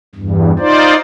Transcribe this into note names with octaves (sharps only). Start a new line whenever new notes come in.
E2 G2
D#4 F4 C5 D5